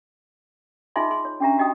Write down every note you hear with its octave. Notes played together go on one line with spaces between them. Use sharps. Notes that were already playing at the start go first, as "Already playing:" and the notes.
D#4 F4 G#4 D#5 E5 C6
G#4 C6
C#5
C#4 D4 G4 E5 A#5
F#4 G4 D#5 G5 D#6